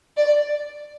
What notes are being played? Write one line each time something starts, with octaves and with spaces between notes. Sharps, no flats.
D5